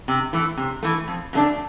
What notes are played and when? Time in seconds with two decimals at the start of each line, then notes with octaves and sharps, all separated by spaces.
0.08 C3
0.33 E3 A3
0.57 C3
0.83 E3 A3
1.08 F2
1.33 C#3 F#3 A3 D4